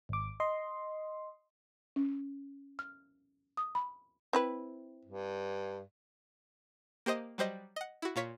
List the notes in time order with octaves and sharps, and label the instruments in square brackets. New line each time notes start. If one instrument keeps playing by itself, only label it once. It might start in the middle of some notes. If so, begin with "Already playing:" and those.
[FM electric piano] G#1 D6
D#5 C6
[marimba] C#4
F6
D#6
B5
[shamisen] C4 E4 B4
[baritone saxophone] G2
[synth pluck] A#3 G4 C5 D#5
F#3 G3 C5 D#5
D#5 F#5
E4 F#4
A#2 F4 C#5 B6